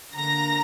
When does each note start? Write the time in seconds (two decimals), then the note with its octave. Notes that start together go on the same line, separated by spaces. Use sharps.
0.15 D3 A#3 A#5 A#6